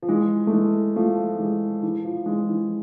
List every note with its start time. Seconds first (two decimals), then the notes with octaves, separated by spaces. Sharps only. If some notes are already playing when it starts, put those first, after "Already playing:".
0.02 F3
0.09 E3 G#3
0.47 A3
0.52 E3 G#3
0.96 F3 A3
1.39 E3 G#3
1.82 E3
2.05 F3
2.26 E3 G#3
2.49 E3